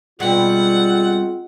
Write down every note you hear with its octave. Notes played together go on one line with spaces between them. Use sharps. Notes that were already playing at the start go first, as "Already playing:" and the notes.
B2 G3 G#3 C4 F4 F#5